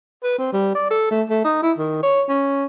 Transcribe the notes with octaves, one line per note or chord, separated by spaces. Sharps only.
B4
C4
G3
D5
A4
A3
A3
D#4
E4
D#3
C#5
C#4